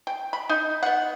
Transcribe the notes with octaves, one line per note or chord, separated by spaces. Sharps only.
G5
B5
D#4
B3 F#5